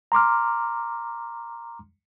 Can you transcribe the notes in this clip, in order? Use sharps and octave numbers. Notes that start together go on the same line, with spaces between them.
A#5 C6 D6 F6